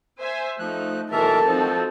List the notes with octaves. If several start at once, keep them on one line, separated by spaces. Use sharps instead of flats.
C5 E5 G#5
F3 A3 D#4 F#6
B2 E3 A4 A#4 C5 E5 A5
F3 C4 D#4 F#4